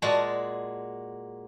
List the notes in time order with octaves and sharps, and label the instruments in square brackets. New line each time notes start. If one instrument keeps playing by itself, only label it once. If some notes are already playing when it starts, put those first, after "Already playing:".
[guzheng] A#2 G#3 F#4 A5